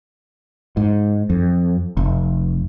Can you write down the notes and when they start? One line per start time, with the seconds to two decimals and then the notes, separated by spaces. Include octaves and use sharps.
0.77 G#2
1.30 F2
1.97 F1